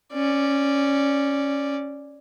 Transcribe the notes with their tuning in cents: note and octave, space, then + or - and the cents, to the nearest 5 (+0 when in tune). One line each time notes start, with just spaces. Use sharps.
C#4 -5 D5 +0